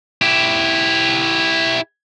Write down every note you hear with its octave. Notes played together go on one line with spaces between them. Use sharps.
E4 G4